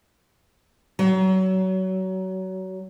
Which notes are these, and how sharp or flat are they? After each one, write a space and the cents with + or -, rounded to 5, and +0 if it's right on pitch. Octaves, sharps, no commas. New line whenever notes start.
F#3 +25